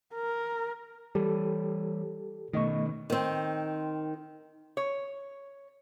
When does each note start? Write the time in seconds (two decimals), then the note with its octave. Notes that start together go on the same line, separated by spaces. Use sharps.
0.14 A#4
1.15 E3 G3 G4 A4
2.54 B2 D#3 A3 D#5 C#6
3.10 D#3 C4
4.77 C#5